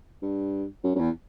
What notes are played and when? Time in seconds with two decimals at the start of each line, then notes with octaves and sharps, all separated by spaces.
0.22 G2
0.84 F#2
0.95 F#2
0.99 E2